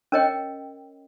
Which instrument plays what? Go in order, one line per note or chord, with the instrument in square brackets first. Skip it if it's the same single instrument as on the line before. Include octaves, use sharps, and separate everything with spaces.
[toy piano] C#4 A#4 C#5 D#5 G5